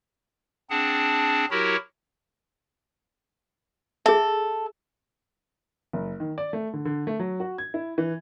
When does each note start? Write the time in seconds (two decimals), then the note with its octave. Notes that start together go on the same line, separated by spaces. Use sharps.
0.70 C4 D4 G#4 F#5 A5
1.51 F#3 E4 F#4 G4 A#4 C#5
4.06 G#4 A4 E5
5.93 F#1
6.20 D#3
6.38 D5
6.53 A3
6.73 D3
6.85 D3
7.07 A3
7.19 F#3
7.40 F#4
7.58 G#6
7.74 E4
7.98 E3